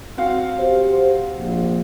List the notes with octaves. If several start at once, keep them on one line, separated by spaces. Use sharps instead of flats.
C4 F#4 F5
G4 C5
A#1